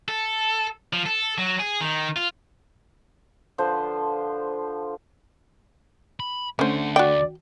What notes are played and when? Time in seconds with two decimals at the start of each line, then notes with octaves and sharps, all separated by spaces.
0.08 A4
0.93 F3
1.06 A4
1.38 F#3
1.60 G#4
1.81 D#3
2.16 F4
3.58 D3 F3 B4 C5
6.20 B5
6.59 D2 D3 A3 C#4 C5 F#5
6.96 F#4 D5 G5